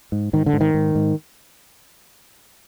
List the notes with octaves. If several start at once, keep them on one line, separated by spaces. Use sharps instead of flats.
G#2
G#2 D#3
D3
G#2
D#3
G#2
G#2